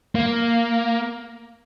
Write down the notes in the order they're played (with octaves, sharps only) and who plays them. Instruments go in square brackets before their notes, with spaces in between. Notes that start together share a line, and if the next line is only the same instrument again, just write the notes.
[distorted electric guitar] A#3